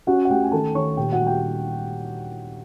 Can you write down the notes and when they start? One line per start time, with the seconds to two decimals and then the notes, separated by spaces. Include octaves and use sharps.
0.07 C#4 F#4 F#5
0.25 F#5
0.30 A3 G4 G5
0.44 G#5
0.52 D#3 A4 A5
0.75 D#3 C#5 C#6
0.97 A#2 G4 G5
1.13 F#4 F#5
1.19 G3
1.27 G4 G5